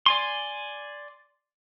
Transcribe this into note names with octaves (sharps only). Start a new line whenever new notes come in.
D5 G#5 C6